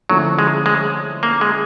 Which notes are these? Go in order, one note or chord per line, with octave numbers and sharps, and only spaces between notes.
D3 F3 F#3 A3 C#4 E4
G#3
G#3
A#3
G#3